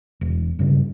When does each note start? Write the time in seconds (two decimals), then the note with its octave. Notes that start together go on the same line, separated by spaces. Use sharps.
0.21 E1
0.59 G2 C#3